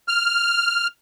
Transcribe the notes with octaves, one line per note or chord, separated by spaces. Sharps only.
F6